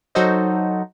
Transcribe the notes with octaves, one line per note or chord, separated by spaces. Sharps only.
F#3 D#4 F#4 A4 C5 D#5